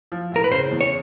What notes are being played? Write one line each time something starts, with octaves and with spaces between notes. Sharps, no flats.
F3
A2 A#4
B4
C#3 C5
E2
C#5